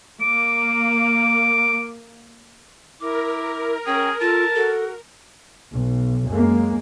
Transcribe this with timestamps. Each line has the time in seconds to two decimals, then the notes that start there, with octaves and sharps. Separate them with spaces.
0.21 A#3 D6
3.00 E4 A#4 D6
3.86 C#4 G#4 G5
4.21 F4 A4 A5
4.55 F#4 A4
5.71 B1
6.29 F#2 G#3 A#3